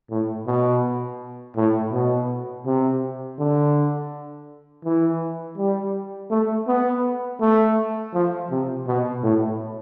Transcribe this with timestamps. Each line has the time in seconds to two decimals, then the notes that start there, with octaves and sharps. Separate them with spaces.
0.10 A2
0.47 B2
1.56 A2
1.92 B2
2.66 C3
3.39 D3
4.85 E3
5.58 G3
6.31 A3
6.67 B3
7.41 A3
8.14 F3
8.50 C3
8.87 B2
9.23 A2